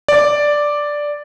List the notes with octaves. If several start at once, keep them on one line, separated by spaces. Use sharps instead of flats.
D5